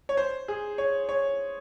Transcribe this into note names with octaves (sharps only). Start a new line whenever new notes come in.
C#5
C5
G#4
C#5
C#5